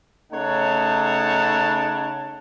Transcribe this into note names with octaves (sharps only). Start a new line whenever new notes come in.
C#3 A3 D#4 C#5 F#5 A5